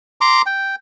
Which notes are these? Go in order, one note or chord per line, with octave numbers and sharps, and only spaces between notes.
A#5 C6 D6
G5